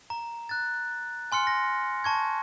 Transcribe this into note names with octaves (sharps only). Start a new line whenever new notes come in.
A#5
F#6 A6
G#5 C6 F6 C#7
A#6
A5 C#6 G#6